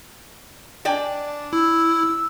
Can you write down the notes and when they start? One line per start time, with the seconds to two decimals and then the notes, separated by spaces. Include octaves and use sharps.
0.85 D4 D5 G5 G#5
1.53 E4 E6